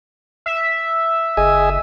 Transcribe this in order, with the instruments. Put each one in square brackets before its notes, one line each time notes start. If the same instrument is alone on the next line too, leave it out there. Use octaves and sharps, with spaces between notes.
[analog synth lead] E5
[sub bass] F#1 [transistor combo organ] G#4 D#5 G#5